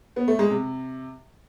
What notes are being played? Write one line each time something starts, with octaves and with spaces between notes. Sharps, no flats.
B3
A3
G#3
C3